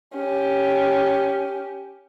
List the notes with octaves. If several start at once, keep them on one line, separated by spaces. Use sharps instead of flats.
C#4 G4